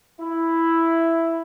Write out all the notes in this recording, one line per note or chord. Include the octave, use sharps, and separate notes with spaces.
E4